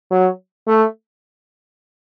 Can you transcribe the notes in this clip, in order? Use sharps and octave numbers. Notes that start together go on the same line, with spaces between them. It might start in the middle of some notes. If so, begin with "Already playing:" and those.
F#3
A3